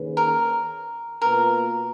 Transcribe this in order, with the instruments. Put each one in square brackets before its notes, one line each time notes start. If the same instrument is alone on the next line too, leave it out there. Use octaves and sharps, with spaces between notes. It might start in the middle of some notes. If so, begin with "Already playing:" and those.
Already playing: [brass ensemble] D#3 A#3 C#4 G#4 B4
[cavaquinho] A#4
[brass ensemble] B2 A#3 F4 B4 [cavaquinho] A#4